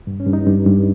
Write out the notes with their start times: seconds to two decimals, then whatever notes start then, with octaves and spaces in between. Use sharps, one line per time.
0.07 G2
0.20 C#4
0.26 G2
0.33 D#4
0.46 G2
0.66 G2